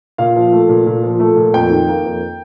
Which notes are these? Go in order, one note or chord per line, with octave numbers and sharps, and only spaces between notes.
A#2 F5
F3
A3
A#2
A#2
F3
A3
A#2
F2 G5
D#3
A#3
F2